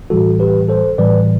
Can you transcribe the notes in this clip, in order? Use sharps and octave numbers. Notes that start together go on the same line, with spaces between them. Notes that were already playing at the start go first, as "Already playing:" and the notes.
A2 E3 G3 F#4 A4
G4 B4
A4 C5
A2 E3 G3 B4 D5